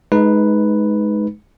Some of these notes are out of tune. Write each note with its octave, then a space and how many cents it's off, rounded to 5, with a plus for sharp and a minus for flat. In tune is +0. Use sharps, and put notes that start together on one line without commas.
G#3 +25 D#4 +0 B4 +0